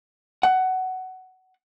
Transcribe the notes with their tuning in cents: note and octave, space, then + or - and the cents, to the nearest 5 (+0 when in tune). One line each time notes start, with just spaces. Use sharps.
F#5 +15